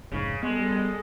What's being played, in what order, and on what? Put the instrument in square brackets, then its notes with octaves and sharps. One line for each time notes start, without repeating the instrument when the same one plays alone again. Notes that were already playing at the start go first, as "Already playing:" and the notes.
[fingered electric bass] F1 G#2 [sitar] C#3
[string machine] G3 A4 D#5 [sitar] G#3 [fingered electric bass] B3